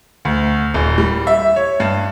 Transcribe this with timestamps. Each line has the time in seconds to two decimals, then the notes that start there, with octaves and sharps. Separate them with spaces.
0.25 D2
0.74 D#1
0.98 G3
1.27 E5
1.56 C#5
1.80 G2